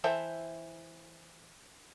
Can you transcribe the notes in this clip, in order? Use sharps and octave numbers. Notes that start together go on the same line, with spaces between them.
E3 A4 C5 E5 G5